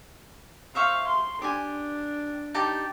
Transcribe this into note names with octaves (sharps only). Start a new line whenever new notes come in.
C5 E5 F5 C#6
C6
D4 G4 G#5
D#4 G4 A5